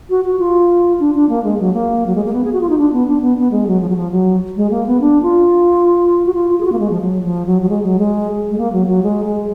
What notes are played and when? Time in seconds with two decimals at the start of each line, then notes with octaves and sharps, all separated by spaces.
0.10 F#4
0.24 F#4
0.40 F4
1.00 D4
1.15 D4
1.29 A#3
1.44 G#3
1.59 F#3
1.74 A#3
2.07 F#3
2.15 G#3
2.24 A#3
2.33 B3
2.44 G#4
2.53 F#4
2.61 F4
2.69 D#4
2.78 D4
2.93 B3
3.07 D4
3.22 B3
3.38 B3
3.52 G#3
3.67 F#3
3.81 F3
3.89 F#3
3.97 F3
4.12 F#3
4.56 G#3
4.71 A#3
4.87 B3
5.01 D4
5.23 F4
6.26 F#4
6.34 F4
6.50 F4
6.61 G#4
6.65 F#4
6.72 A#3
6.79 G#3
6.90 F3
7.02 F#3
7.23 F3
7.46 F#3
7.62 F#3
7.69 G#3
7.83 F#3
7.99 G#3
8.51 G#3
8.58 A#3
8.73 F#3
8.87 F#3
9.03 G#3
9.25 G#3